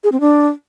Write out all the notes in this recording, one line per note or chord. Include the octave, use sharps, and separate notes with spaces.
G#4
C4
D4